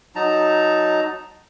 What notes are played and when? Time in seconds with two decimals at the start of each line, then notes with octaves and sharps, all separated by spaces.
0.16 F#3 D#4 A5 A#5